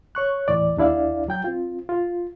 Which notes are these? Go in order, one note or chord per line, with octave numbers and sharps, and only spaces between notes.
C#5 C#6 F#6
D#2 A2 E3 D5
D#2 D4 E4 D5 F5
F#3 G5 G6
C4 F4
F4